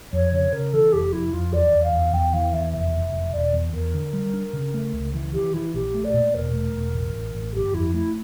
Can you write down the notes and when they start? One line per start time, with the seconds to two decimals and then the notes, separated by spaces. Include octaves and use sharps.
0.13 F2 C#5
0.32 C#3 C#5
0.52 C#3 A#4
0.73 E3 A4
0.92 F1 G4
1.12 F2 E4
1.33 F2 F4
1.53 E2 D5
1.72 E2
1.83 F5
1.93 E2
2.13 E2 G5
2.33 E3 F5
2.53 E2 E5
2.73 F1 E5
2.93 F1
3.13 F1
3.33 E1 D5
3.53 E2
3.73 E2 A#4
3.94 D3
4.13 G3
4.33 D4
4.53 C#3
4.74 A3
4.93 C#2
5.14 E3
5.33 E3 G4
5.54 E3 E4
5.74 A#1 G4
5.94 A3
6.04 D5
6.14 A#2
6.34 E1 A#4
6.53 A3
6.73 E1
6.93 A1
7.14 A1
7.35 A1
7.54 G1 G4
7.74 F2 E4
7.94 A3 E4